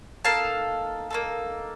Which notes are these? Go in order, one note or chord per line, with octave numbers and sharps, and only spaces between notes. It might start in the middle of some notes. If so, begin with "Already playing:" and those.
A#3 D#4 A4 F5 A5
A#3 D#4 A4